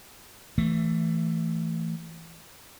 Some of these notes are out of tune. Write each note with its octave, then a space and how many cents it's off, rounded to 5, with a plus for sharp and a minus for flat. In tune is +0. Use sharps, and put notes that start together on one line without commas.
E3 +5 A3 +15